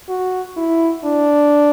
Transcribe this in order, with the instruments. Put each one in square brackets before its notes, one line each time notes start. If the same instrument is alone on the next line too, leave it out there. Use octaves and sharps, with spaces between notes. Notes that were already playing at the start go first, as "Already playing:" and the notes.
[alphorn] F#4
E4
D4